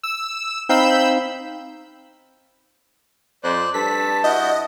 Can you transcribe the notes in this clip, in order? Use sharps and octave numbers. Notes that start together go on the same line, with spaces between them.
E6
C4 D#4 F5 B5 E6 G6
F2 C5 D5 F#6
G2 A4 A5 B6
E4 F#4 D#5 G6